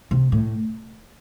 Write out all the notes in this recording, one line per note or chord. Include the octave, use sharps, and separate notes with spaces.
C3
A2